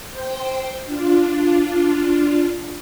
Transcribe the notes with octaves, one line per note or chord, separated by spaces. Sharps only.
C5 G5
D4 F4